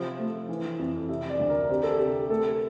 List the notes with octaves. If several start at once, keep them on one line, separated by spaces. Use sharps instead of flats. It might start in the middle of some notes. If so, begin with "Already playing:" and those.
Already playing: C3 F3
A3
E3
F2
C3 E5
D5
D2
A#4
C4 G4
A4
C3 G4
A3 A4